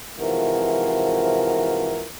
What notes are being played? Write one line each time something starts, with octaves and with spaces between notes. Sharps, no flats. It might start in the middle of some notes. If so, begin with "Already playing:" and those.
G#2 C3 E3 F3 F#4 A#4